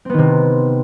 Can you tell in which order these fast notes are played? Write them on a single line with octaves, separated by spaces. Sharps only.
C4 B3 D#3 C3